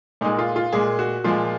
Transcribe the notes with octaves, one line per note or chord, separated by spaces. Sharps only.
A#2 G#3 D#4
F4
F4
A#2 G#3 G#4
F#4
A#2 F3 G#3 F4